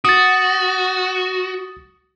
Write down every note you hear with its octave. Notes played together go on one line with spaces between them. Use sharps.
F#4 D#6 A6